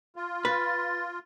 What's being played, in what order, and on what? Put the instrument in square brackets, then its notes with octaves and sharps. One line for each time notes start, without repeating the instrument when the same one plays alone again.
[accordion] F4
[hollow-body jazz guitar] B4 [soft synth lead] A6